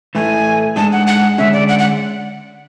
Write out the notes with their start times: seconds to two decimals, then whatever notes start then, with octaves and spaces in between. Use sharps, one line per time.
0.15 A2 E3 A3 G#5
0.76 G#2 G#3 D4 G#4 A5
0.92 F#5
1.07 F#5
1.38 D3 G#3 C#4 G#4 E5
1.53 D5
1.69 F#5
1.79 F#5